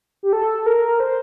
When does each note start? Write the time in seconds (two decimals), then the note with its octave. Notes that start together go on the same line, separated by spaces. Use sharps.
0.23 G4
0.33 A4
0.66 A#4
1.00 C5